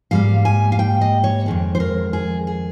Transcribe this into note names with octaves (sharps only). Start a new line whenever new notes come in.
G#2 G3 A#3 F5
G#5
F5
G5
D#5
C#5
F2 D#3 G#3
C5
A#4
G#4
G#4